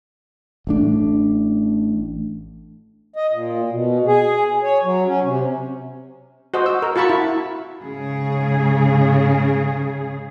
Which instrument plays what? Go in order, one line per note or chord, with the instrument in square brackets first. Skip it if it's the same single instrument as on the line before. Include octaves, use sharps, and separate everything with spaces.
[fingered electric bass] A1 A3 D4
[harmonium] D#5
A#2
B2
G#4
C#5
F#3
C#4
C3
[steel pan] F#4 C5 D#5
E6
A#4
F4 F#4 A5 B5 C#6
E4
[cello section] G#2 C#3 G#4